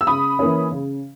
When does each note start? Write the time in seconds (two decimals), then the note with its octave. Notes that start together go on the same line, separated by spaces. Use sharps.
0.01 E6
0.07 C#3 B5 D#6
0.39 E3 A#3 C#4
0.72 C#3